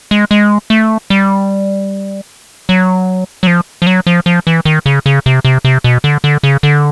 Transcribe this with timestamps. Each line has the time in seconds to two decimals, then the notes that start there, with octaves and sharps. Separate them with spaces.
0.11 G#3
0.31 G#3
0.70 A3
1.10 G3
2.69 F#3
3.43 F#3
3.47 F3
3.82 F3
3.87 F#3
4.07 F3
4.26 F3
4.47 E3
4.65 D#3
4.86 C#3
5.06 C#3
5.26 C3
5.45 C3
5.65 C3
5.84 B2
6.04 D3
6.24 D3
6.43 C#3
6.63 D3